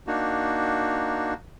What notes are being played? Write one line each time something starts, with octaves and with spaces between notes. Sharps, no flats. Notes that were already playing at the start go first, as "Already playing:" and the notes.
A#3 D4 D#4 F#4